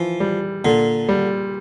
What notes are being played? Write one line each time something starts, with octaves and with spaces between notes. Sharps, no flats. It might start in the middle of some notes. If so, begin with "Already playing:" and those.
Already playing: E3 F3
G3
A#2 D3
G3